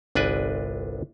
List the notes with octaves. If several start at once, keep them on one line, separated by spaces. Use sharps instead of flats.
G1 C2 D4 B4 G#5